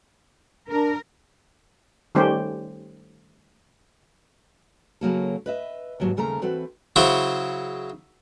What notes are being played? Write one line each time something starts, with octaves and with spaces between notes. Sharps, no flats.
D4 A#4
D#3 G3 A3 C#4 G4 C5
C#3 F#3 A#3 A4
B4 D#5 E5
D#2 G#2 F#3 G4 A5
D#2 C#3 A3 A4 A#4 A#5
E3 C4 F#4 A4 B4
C#3 F#3 E4 C5